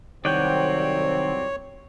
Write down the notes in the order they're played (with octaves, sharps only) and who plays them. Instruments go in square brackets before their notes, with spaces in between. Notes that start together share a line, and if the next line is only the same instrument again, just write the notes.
[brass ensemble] C2 F#3 C4 [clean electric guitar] D#3 [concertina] C#5 [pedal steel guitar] D5 F#5 G5